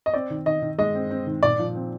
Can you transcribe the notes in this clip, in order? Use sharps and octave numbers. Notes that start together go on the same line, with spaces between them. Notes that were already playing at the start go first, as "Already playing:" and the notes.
D#5
C4 D5
D#3
D#3 D#5
D#3
G#3 D#5
C4
C4
D#3
A#2 D5
F3
C4